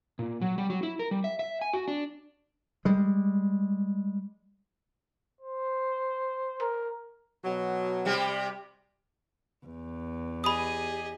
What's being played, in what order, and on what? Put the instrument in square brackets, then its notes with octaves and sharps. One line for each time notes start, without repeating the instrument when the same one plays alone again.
[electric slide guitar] A#2
F#3
G3
F#3
E4
A#4
G3
E5
E5
G#5
F#4
D4
[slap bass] G3 G#3
[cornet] C5
[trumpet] A#4
[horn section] B2 F#3
[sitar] C3 G3 G4
[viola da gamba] E2
[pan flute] G4 [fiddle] G#4 D#5 [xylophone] B5 D#6